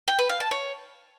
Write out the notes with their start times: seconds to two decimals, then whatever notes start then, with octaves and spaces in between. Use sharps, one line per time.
0.08 G5
0.19 B4
0.29 F5
0.40 A5
0.51 C#5